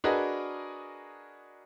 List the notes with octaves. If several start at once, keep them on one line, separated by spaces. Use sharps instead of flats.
D4 F#4 G#4 A#4 B4 D#5